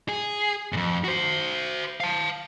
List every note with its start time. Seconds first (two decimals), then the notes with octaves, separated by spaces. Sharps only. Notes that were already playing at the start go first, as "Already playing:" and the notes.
0.09 G#4
0.73 F2 G#2
1.04 F#4 C5
2.00 F5 A5